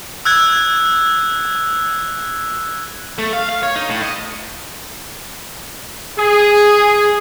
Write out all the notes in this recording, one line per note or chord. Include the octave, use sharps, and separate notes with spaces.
E6 F#6 G#6
A3
F5
F5
C#5
D#4
A2
D#5
G#4